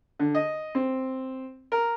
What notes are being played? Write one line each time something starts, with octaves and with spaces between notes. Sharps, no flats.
D3
D#5
C4
A#4